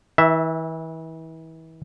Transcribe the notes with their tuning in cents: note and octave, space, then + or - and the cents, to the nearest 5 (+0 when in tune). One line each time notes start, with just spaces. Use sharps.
E3 -35 E5 +0